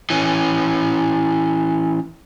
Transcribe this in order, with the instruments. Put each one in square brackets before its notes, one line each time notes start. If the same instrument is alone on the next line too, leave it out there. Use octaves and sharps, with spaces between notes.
[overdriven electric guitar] E3 C#4